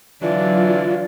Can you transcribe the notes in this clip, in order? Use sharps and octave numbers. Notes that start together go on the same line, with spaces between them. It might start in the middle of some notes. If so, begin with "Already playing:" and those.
D3 E3 F#3 F4 D5